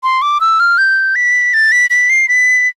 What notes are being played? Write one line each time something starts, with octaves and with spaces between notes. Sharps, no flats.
C6
D6
E6
F6
G6
B6
A6
B6
B6
C7
B6